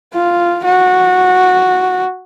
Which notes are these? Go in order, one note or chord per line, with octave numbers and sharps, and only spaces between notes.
F4
F#4